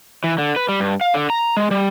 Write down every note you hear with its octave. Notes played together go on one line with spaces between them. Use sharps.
E3
D3
B4
G3
G2
F5
D3
A#5
G#3
G3